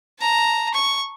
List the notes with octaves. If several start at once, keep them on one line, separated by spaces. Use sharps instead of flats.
A5 A#5
C#6